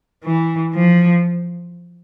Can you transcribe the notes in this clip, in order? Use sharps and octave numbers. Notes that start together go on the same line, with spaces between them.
E3
F3